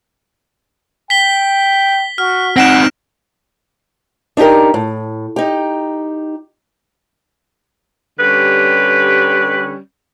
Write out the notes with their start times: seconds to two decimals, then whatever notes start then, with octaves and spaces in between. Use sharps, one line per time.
1.10 G5 B6 G7
2.18 F#4 F6
2.56 C4 D#4 F#5 A#6 D7 E7
4.37 D4 D#4 F#4 G4 A#4
4.74 A2
5.36 D#4 G4
8.20 D3 G3 C#4 G4 B4